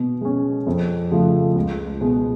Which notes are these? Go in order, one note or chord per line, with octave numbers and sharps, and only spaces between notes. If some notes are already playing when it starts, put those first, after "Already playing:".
Already playing: B2
G#3 C#4
F2
C#3 F3 A3
C#2
B2 G#3